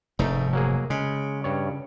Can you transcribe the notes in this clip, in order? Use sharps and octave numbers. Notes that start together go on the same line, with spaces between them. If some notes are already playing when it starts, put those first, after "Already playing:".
F1 G#2 A3 D#4
F#3 A#3 G#4
C#3 G#3
G2 C#5